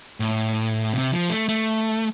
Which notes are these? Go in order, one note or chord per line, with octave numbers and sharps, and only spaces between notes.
A2
C3
F3
A3
A3